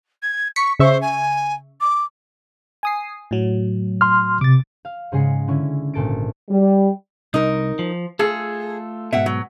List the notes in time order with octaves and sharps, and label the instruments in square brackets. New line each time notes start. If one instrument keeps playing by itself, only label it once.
[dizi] G#6
[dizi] C#6 [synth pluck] B6 C#7
[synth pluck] C#3 E5 C#6 [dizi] C5
[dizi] G#5
D6
[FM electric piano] G#5 D#6 C7
A2 F#3
[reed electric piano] C6 F6
[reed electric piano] C3 [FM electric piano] D6 A6
[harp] F5
G#2 C#3 G#3 G#4 C7 C#7
D3 C#4 E4
G#1 A#2 A4 A6 D7
[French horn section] G3
[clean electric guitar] C2 [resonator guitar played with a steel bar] D#4 A#4
[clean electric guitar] F3
[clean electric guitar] A3 F4 A4 [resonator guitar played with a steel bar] G#4
[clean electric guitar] G#2 B2 [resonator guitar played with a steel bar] E5 F#5
[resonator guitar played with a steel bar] F#3